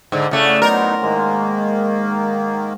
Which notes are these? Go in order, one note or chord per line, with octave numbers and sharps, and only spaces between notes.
G#2 D3
A2 C#3 A3 D5 F#5
F#3 B3 D#4 A#4 C5 F#5 C#6
G#2 D#3 G#3 A#3